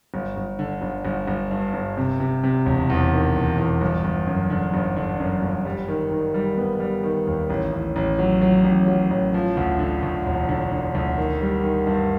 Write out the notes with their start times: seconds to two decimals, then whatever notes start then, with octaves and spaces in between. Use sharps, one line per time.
0.14 G1
0.37 G1
0.59 D3
0.82 G1
1.05 G1
1.28 G1
1.51 G2
1.74 G1
1.97 C3
2.20 C3
2.44 C3
2.66 E1
2.90 E2
3.13 D#3
3.35 E1
3.58 E2
3.81 G1
4.05 G1
4.27 F#2
4.50 D3
4.74 G1
4.96 D3
5.20 F#2
5.42 G1
5.65 G3
5.88 D#3
6.11 D#3
6.34 G3
6.57 B3
6.80 G3
7.04 D#3
7.27 D#2
7.50 A1
7.72 A1
7.96 A1
8.19 F#3
8.41 F#3
8.64 A1
8.88 F#3
9.11 A1
9.34 F3
9.57 D2
9.79 D3
10.03 D2
10.26 E1
10.49 D3
10.72 D3
10.95 D2
11.17 D#3
11.41 G3
11.64 D#3
11.87 G2